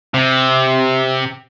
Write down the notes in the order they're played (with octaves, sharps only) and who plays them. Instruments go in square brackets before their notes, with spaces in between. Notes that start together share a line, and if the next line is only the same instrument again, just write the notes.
[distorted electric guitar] C3